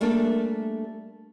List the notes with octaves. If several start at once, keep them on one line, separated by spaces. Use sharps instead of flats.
G3 A3 A#3 D4 G#4 A4